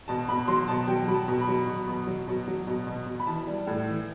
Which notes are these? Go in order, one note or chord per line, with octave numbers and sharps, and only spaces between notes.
B2 A5
B2 B5
F#3 C6
B2 A5
F#3 G5
F#3 B5
A5
B2
B5
F#3
B2
B2
F#3
B2
F#3
B2
B2
B2
B5
E3 A5
G3
A2
E3